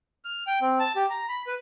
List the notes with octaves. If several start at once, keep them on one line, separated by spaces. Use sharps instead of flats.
F6
G5
C4
A5
G4
A#5
B5
B4